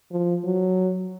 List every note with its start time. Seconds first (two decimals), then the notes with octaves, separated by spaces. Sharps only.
0.11 F3
0.44 F#3